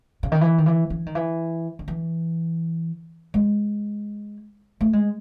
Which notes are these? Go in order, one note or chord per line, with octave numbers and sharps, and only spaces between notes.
C#3
D#3
E3
D#3
E3
E3
D#3
E3
D#3
E3
G#3
A3
G#3